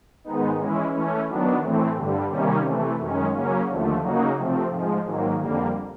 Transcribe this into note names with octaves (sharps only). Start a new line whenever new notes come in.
G#2 D#3 G#3 B3 D#4
E3 G#3 C#4 E4
E3 A3 C#4
D#3 F#3 B3 D4
A2 E3 A3 C4
G2 D3 G3
C3 D#3 G3 A#3 C#4
C3 E3 A3
F#2 D#3 G#3 C#4
C#3 F#3 A#3 C#4
D#2 D3 F3 A3
C#3 F#3 A#3 D#4 F#4
C3 F3 A3 C4
G#2 F3 G#3
G#2 D#3 F#3 A#3
F2 D3 G3 A#3